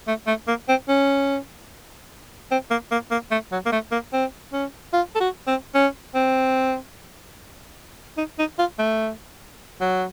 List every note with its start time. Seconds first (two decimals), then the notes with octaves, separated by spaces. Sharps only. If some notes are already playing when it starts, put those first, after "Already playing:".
0.07 A3
0.27 A3
0.48 A#3
0.69 C4
0.89 C#4
2.51 C4
2.70 A#3
2.91 A#3
3.11 A#3
3.31 A3
3.52 F#3
3.66 A#3
3.72 A3
3.92 A#3
4.13 C4
4.53 C#4
4.93 F4
5.15 A4
5.20 F#4
5.47 C4
5.74 C#4
6.15 C4
8.17 D#4
8.39 D#4
8.59 F4
8.79 A3
9.81 F#3